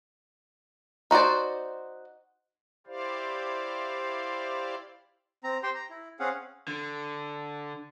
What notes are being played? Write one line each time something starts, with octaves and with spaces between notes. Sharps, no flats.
D#4 F#4 C5 D5
E4 G4 C5 D5 F5
C4 A#5
G4 C5 G5 C6
A#5
E4
C4 C#4 G#4 F5 F#5
D3